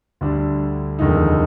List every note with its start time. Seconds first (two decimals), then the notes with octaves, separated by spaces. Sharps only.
0.21 D2 D3 G3 D4
0.99 F1 D#2 D3 G#3 D#4